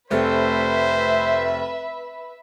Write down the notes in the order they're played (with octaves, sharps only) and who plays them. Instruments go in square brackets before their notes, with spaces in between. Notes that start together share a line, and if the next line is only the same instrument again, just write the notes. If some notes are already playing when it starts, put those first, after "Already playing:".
[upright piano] F1 A3 C4 [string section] B4 E5 [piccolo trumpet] C5